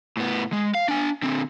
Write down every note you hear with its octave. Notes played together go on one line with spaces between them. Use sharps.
A2 B3
G#3
F5
D4 G#5
D3 C4